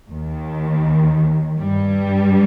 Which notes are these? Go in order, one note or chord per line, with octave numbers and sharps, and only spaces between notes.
D#2 D#3
G2 G3